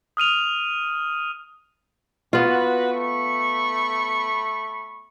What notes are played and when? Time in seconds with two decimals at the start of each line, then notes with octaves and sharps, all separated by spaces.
0.17 D#6 F6 D#7 F7
2.33 B3 F4 F#4 B4
2.92 A3 B5 C#6